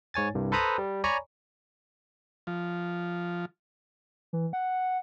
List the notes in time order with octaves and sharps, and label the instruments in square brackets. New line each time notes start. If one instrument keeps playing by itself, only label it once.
[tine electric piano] G#2 C#5 G#5 A6
C2 G2
A4 B4 C5 A#5 B5 D#6
G3
C#5 D5 G#5 A#5 B5 C#6
[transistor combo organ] F3
[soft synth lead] E3
F#5